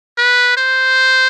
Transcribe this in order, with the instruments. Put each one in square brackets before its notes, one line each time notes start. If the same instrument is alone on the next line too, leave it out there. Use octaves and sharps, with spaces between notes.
[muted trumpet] B4
C5